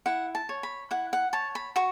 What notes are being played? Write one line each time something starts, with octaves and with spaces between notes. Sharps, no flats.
E4 F#5
A5
C#5
B5
E4 F#5
F#5
C#5 A5
B5
F#4 C#6